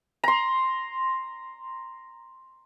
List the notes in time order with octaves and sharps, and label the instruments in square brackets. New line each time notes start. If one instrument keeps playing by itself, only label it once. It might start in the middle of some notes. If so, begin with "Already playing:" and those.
[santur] A#5 C6